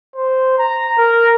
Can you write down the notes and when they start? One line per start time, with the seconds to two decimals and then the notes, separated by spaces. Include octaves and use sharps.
0.16 C5
0.59 A#5
0.98 A#4